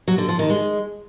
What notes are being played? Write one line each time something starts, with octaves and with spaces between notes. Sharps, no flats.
F#3
D3
F3
D#3
G#3